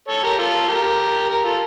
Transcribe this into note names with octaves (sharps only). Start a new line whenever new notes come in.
A4 C#5
G4 A#4
F4 A4
G4 A#4
G4 A#4
F4 A4